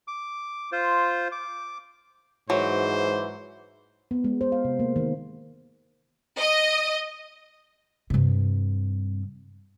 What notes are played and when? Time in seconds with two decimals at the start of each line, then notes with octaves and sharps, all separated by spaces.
0.08 D6
0.72 F4 C5
1.32 D6
2.50 G#2 E3 F#3 C5
4.11 B3
4.24 G#3
4.41 C5
4.52 F5
4.65 C3
4.79 A#3
4.96 D#3
6.38 D#5
8.10 G2 C3